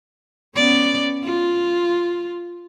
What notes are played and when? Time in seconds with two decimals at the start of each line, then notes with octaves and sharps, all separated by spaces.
0.56 B3 C#4 D5
1.23 F4